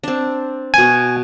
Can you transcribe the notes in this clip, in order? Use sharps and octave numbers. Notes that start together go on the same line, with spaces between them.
C4 D4
B2 G#5 C#6